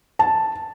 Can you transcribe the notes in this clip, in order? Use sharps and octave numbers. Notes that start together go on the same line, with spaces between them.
A5